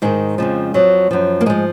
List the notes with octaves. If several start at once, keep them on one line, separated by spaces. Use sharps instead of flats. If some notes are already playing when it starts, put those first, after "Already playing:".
G#2 D#3 G#3
F2 C#3 F3
F2 F3 F#3
F#2 F3
A#3
G#2 F3 G#3